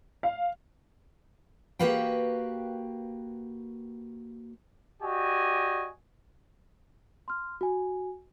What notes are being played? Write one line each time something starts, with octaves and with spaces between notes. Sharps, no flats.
F5
A#3 F#4 G4 B4 F5 G5
F#4 G4 D5 D#5 G#5
C6 F6
F#4 G#5